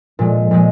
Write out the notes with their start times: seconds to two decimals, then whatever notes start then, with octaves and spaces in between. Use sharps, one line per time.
0.19 A#2 F3 G#3
0.51 A#2 F3 G#3